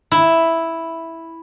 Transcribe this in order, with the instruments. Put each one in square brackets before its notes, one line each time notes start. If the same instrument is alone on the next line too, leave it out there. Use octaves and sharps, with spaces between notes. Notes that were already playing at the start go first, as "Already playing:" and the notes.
[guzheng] E4